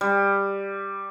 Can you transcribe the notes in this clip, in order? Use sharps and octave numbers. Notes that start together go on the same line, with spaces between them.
G3